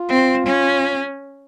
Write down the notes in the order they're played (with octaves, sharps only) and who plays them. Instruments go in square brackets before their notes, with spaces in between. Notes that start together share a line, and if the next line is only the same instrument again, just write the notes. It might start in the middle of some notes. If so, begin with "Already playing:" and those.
Already playing: [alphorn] F4
[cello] C4
C#4